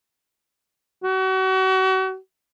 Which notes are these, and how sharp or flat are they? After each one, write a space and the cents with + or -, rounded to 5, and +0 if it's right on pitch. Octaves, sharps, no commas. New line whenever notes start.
F#4 +35